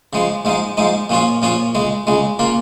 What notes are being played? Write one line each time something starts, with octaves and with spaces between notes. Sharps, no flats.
C#3 F3 G#3
G#2 F3 G#3 D#4
G#2 F3 G#3 D#4
A#2 F3 C#4 F4 G#4
A#2 F3 C#4 F4 G#4
C#2 C#3 G#3
C#2 C#3 G#3
C#3 A#3 F4